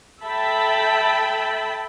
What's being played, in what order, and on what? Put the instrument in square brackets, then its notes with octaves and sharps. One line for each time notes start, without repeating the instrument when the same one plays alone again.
[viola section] A4 E5 G5 A5 B5